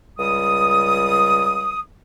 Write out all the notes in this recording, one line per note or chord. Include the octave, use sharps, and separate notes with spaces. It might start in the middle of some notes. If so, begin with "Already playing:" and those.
C#2 G3 D#6